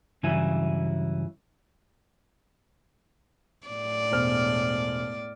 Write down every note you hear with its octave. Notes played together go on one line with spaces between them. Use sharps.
G2 C#3 E3 F#3 E4 G#5
A2 D5
E1 C5 F6